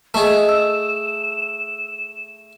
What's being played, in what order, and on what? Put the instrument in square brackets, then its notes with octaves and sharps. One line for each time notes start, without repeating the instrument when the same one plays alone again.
[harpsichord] A3 G#4 [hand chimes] A4 D#5 [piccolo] E7
[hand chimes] E6